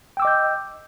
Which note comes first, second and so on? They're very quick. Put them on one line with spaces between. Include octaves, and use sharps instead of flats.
G5 E6 D6 D#5 G6